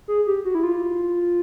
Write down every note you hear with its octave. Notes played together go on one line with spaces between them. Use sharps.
G#4
G4
F#4
E4
F4